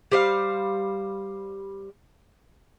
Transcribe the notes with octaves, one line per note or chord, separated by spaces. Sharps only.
G3 C5 F5